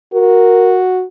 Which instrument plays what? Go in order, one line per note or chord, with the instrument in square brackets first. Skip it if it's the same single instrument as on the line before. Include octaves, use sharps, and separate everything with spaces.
[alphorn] F#4 [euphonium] A#4